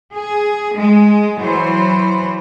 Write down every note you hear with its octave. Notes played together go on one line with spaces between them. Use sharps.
G#4
G#3
E3 F#3 C5